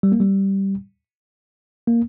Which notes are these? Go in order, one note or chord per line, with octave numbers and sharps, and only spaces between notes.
G3
A#3
G3
A#3